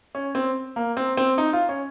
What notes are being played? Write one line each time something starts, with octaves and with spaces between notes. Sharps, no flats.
C#4
C4
A#3
C4
C4
D#4
F4
C#4